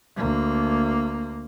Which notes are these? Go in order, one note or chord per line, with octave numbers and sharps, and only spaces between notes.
D2 A#3